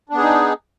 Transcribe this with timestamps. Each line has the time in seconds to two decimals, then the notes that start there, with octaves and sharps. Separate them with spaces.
0.09 D4
0.14 B3
0.18 G#4
0.22 D#4